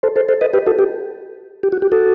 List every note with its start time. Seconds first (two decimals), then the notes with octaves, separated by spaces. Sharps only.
0.03 A4 C5
0.16 A4 C5
0.29 A4 C5
0.41 B4 D#5
0.53 G4 B4
0.66 F#4 A4
0.79 G4
1.63 G4
1.72 F#4
1.82 G4
1.92 F#4 A4